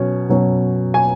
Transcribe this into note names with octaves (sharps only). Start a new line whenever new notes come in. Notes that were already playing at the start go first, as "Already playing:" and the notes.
Already playing: B2 F#3 C#4
B2 F#3 C#4
G#5